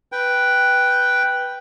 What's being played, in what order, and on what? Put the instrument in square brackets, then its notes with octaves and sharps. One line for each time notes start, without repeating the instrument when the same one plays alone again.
[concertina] B4 G5